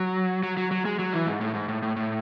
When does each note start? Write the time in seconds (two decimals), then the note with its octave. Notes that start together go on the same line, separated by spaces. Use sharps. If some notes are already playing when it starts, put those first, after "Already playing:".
Already playing: F#3
0.43 F#3
0.57 F#3
0.71 F#3
0.85 G#3
0.99 F#3
1.13 E3
1.27 G#2
1.41 A2
1.54 G#2
1.68 A2
1.82 A2
1.96 A2